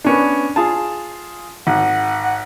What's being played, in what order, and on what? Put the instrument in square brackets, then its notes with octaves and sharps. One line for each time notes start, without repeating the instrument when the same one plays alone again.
[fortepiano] B3 C#4 D4
F4 G#4 A5
[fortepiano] G#1 [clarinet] F#5
[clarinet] F#5